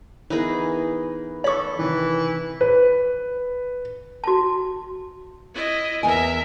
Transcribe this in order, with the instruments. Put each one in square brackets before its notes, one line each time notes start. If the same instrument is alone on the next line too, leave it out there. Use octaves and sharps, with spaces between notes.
[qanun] E3 D#4 G#4 [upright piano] B3 A#4 B4
[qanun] A4 B5 [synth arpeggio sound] C#5 C#6
[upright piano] C3 D#3 [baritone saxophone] E3
[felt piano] B4
[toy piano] F#4 A5
[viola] E4 D#5
[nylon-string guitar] E2 G#5 [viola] A#4 E5